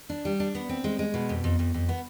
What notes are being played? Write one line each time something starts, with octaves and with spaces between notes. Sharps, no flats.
D4
G3
D4
B3
C4
G#3
G#3
B2
F2
F2
F2
F2
B3